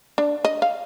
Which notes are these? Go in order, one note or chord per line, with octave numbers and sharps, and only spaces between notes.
D4
D#5
F5